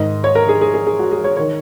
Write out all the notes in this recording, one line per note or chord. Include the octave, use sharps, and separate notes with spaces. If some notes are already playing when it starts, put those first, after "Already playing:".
Already playing: G#2 D#3 D#5
C#5
A#4
G#4
G#4
G#4
G#4
F#4
G#4
C#5
D#3 C#5